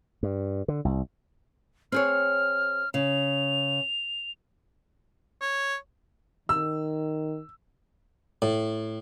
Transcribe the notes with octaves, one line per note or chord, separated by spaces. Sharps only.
G2
D3
C2
C4 G#4 C#5 F6
C#3 F7
C#5
D#3 E6
A2